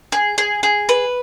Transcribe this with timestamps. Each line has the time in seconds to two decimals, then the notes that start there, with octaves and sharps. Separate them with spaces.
0.12 G#4
0.38 G#4
0.63 G#4
0.89 B4